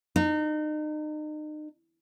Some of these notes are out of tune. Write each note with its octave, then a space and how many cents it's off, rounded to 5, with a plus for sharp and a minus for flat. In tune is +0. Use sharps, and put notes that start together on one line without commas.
D#4 -35